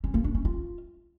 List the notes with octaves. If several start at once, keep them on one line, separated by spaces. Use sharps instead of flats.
C#4
A#3
D4
C#4
F4